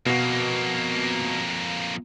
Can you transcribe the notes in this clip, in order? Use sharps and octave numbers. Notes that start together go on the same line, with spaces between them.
F2 B2 A#3 F#4